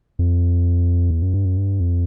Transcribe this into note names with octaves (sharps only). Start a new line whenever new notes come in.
F2
E2
F#2
G2
F#2
G2
F2